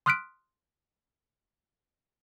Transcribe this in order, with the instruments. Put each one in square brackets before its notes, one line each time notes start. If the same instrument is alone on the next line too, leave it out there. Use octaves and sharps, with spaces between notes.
[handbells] C6 D#6 F6 F#6 B6 D7